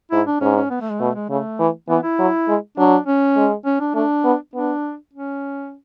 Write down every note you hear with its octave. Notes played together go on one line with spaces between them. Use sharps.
G#2 E4
D4
G#2 C#4
C#4
B3
A3
G#3
B2 A3
G#3
C#3 A3
E3
E3 B3
E4
F#3
G#3
F#3 D4
C#4
G#3
C#4
D4
A3 D4
B3
B3 D4
C#4